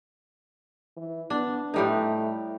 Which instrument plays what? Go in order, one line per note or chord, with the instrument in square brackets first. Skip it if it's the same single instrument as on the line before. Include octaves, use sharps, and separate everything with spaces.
[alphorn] E3
[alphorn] B3 [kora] D4
[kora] A2 G3 D#4 [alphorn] A3